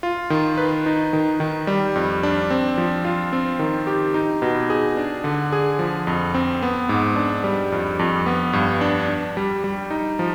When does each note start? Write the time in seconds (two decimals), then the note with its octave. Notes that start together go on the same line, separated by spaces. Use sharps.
0.03 F4
0.30 D#3
0.58 B4
0.86 D#4
1.13 D#3
1.40 D#3
1.67 G3
1.96 F2
2.23 D4
2.50 C4
2.78 F3
3.05 F4
3.33 C4
3.59 D#3
3.87 G4
4.14 D#4
4.42 B2
4.70 G#4
4.97 D4
5.24 D3
5.52 G#4
5.79 F3
6.07 F2
6.34 C4
6.62 B3
6.89 G#2
7.16 D4
7.44 G3
7.72 F2
7.99 F2
8.26 B3
8.53 G2
8.81 D4
9.08 D4
9.37 G3
9.64 G3
9.91 D#4
10.19 F3